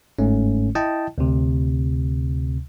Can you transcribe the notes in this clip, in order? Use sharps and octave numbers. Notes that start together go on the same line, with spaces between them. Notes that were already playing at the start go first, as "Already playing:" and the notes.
G1 G#2 A3 C#4
E4 D#5 G5 A5
D2 C3